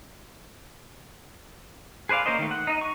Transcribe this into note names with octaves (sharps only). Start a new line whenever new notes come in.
G#4 B4 C5 D5 F5
A#3 C#4 A#4 C5 D#5
D#3 A3
F#5
D#4 D#5
C#6